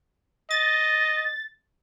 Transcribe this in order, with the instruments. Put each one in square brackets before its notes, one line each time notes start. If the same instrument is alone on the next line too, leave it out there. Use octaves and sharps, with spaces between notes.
[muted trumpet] D#5 [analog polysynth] A6